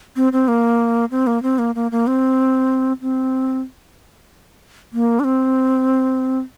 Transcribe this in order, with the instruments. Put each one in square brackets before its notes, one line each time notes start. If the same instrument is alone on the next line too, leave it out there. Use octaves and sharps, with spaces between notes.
[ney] C4
C4
A#3
C4
A#3
C4
A#3
A#3
A#3
C4
C4
A#3
D4
C4